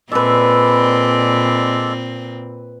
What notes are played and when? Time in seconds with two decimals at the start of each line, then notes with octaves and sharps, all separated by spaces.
0.12 A#2 G#3 C4 A4 B4 D5 E5